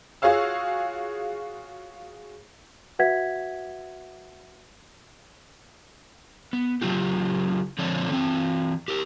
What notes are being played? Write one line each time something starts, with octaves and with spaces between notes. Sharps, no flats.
F4 F#4 G#4 C#5 F5 E6
F#4 B4 E5 F#5 G#6 B6
B3
C#3 F#3 F4 G4
D3 F3 C4 A4 C#5 D5
E3 C4
G4 A#4